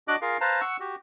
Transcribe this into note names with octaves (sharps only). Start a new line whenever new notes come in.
D4 F#4 D#5 D6 F#6
F4 G#4 A#4 F5
B4 C5 F5 A5 A#5
F#5 C#6 E6
F#4 G4